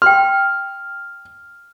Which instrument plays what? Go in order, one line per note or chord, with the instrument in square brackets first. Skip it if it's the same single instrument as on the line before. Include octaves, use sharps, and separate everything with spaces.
[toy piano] G5 C6 [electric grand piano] F6